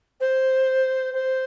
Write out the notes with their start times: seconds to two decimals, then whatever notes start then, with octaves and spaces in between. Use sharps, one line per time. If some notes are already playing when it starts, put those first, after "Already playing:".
0.20 C5
1.13 C5